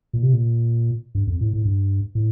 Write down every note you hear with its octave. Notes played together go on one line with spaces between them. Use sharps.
A#2
C3
A#2
G2
F2
A2
A2
G2
A2